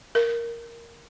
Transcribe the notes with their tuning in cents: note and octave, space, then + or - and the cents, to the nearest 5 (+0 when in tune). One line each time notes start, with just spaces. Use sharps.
A#4 +0